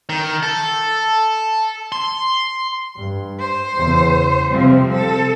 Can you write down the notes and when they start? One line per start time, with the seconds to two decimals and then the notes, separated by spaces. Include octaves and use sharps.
0.09 D#3
0.43 A4
1.92 C6
2.98 G2
3.40 C5
3.77 E2 C#3
4.51 C3 F3 G3 C4
4.92 A4